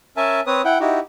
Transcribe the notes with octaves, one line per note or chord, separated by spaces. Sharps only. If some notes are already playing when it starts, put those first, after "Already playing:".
C#4 A#4 E5 G#5 A5
C4 B4 C#5 D#6
E4 F#5 G5
D#4 E4 F#4 G4